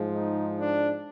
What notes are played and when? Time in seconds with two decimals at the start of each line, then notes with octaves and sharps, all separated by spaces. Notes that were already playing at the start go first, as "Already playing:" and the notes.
Already playing: G#2 F3 G#3
0.12 D#4
0.57 D4